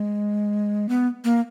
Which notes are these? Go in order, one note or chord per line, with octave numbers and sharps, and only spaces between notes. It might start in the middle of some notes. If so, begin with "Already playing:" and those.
Already playing: G#3
B3
A#3